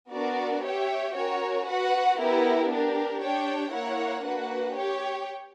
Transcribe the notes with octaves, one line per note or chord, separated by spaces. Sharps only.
B3 D4 F#4 A#4 D5
G4 C#5 E5 G5
C#4 F#4 A#4 C#5
F#4 B4 F#5
B3 E4 G4 A#4
D4 G4 A#4
D4 G4 C#5 G5
A#3 E4 A#4 C#5 F#5
A#3 D4 F#4 B4 F#5
G4 C#5 G5